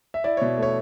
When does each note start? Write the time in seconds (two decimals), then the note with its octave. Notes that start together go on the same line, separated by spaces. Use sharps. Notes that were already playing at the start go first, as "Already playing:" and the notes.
0.14 E5
0.24 E4 D5
0.37 B2 C#5
0.58 A3 C#5